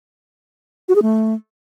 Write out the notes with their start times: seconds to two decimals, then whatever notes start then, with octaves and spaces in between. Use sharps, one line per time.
0.89 F#4
0.95 G#4
1.02 A3